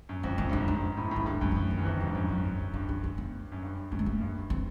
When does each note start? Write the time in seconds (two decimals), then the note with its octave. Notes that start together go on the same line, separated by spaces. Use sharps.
0.09 F#2
0.23 F2 C#4
0.38 F#2 C#4
0.49 G2
0.53 G#2 D4
0.68 G#2 C#4
0.97 A2
1.11 A2 C#4
1.26 G2 C4
1.41 F#2 A3
1.52 F3
1.56 E3
1.71 D#3
1.77 E2
1.85 F2 D#3
1.97 G#2 E3
2.06 G2
2.15 F#2 F3
2.29 F#3
2.44 C4
2.59 C#4
2.73 G2 D4
2.89 D4
3.04 C#4
3.18 B3
3.52 F#2
3.62 G2
3.91 F#2 A#3
3.99 A3
4.06 A#3
4.21 G2
4.50 C4